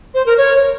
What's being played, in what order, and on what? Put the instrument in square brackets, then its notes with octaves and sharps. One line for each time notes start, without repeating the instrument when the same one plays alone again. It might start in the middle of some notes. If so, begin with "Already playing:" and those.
[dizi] C5
A#4
C#5